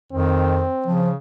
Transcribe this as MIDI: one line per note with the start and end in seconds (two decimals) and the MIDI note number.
0.13 0.67 41
0.13 0.65 51
0.13 1.02 60
0.86 1.16 49
0.86 1.10 53